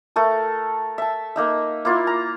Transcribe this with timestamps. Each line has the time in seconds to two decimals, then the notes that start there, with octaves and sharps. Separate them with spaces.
0.16 A3 A4 A#4
0.98 E5 A5
1.36 A#3 D#4 E5
1.85 A#3 E4 F4
2.07 A#5